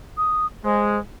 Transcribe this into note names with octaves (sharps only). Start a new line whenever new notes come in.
D#6
G#3 C5